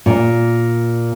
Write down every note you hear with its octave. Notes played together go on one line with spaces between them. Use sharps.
A#2